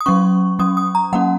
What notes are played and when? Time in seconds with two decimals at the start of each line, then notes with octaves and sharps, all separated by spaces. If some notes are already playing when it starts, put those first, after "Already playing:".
0.01 D#6
0.06 F#3 C#4 C#6
0.59 F#3 C#4 D#6
0.77 D#6
0.95 A#5
1.13 F#3 A#3 C#4 F#5